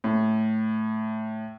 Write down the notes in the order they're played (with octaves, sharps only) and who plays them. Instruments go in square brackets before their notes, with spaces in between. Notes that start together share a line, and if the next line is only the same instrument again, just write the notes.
[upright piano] A2